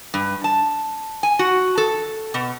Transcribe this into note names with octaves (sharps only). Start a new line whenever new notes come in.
G2
A5
G#5
F#4
A4
B2